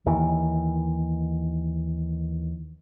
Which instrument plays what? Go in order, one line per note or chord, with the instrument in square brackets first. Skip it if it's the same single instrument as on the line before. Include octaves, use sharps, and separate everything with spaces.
[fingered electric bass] D#2 D#3 E3